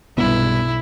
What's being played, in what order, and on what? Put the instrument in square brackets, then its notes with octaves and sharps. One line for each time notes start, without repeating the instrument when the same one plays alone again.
[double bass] B1 [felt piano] G2 [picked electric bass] C3 G3 B3 [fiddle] E4